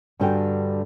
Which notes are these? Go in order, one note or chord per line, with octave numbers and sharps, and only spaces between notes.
G2 D3 G3 F#4 G5 G#5